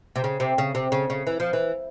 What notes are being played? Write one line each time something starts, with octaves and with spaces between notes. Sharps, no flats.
C3
C#3
C3
C#3
C3
C#3
C#3
E3
F3
E3